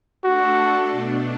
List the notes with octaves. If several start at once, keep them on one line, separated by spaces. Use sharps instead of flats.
A3 D4 F#4 A4
B2 A3 D4